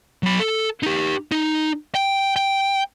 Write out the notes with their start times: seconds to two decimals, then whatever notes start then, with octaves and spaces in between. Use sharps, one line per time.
0.23 F#3 B5
0.39 A4
0.83 D#4 G4
1.32 D#4
1.95 G5
2.36 G5